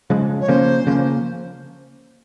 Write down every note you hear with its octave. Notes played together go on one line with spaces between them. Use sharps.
C#3 F3 G#3
C#5
C#3 F3 A#3 C#4 C5
C#3 F3 A#3 C#4